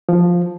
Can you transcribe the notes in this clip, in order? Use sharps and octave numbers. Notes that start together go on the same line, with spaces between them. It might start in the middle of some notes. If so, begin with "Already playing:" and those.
F3